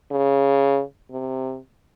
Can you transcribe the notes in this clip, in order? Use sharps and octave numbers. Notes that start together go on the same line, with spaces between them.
C#3
C3